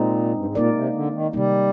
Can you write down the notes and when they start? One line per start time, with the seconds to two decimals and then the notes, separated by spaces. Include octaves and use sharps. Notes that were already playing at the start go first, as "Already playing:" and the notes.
Already playing: A#2 G#3 C4 D#4
0.36 G2
0.45 G#2
0.55 A#2 A#3 D#4 A#4 D5
0.74 C3
0.95 D3
1.14 D#3
1.33 C3 D#3 G3 A#3 D#4